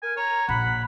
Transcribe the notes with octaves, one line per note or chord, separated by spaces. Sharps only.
A#4 G#5
C#5 A#5
A#1 F#5 B5